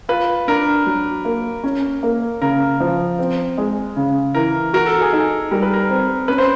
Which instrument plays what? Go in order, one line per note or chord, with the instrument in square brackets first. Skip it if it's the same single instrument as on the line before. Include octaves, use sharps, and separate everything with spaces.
[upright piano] F4 [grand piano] B4
[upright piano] D4 [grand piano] A#4
[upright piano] F#3
A#3
C#4
A#3
[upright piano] C#3 [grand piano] A#4
[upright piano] F3
C4
G#3
C#3
[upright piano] E3 [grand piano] A#4
[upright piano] F#4 [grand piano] A#4
[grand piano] A4
G#4
[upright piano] D#4 [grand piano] A4
[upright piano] G3 [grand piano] A#4
[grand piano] B4
A#4
[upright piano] C4
[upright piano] C#4 [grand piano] B4
[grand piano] C5